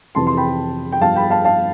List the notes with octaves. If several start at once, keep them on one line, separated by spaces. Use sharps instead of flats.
F2 C3 E3 A5 C6
C6
G5 B5
G5
G2 F3 B3 F5 A5
G5 B5
F5 A5
F5 A5